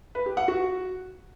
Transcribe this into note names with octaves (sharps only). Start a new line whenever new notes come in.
B4
G4
F#5
F#4